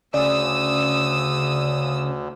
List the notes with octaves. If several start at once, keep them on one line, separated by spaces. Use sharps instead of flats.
D2 C#3 D5 D#6 E6